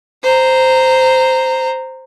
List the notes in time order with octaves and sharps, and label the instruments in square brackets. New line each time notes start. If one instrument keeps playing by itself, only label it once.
[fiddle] C5 A#5